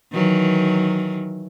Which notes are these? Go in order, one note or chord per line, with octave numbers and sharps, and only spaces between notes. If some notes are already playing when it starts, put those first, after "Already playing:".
D#3 E3 F#3